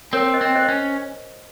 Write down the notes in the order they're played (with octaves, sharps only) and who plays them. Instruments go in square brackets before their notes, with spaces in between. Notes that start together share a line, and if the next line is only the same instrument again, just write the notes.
[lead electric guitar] C4 [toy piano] A#4 C#5
[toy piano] C5 D#5
[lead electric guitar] C4
[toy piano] C5 D#5
[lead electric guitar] C#4